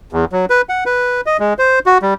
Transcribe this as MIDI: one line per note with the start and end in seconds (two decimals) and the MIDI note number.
0.13 0.25 40
0.32 0.46 54
0.50 0.62 71
0.69 0.84 78
0.86 1.21 71
1.26 1.37 75
1.40 1.54 56
1.59 1.79 72
1.86 1.98 66
2.02 2.14 55